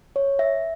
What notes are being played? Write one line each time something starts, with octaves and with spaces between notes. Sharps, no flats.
C#5
E5